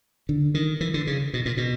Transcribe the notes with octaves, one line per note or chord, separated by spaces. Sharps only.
D3
D#3
E3
D3
C#3
B2
A#2
B2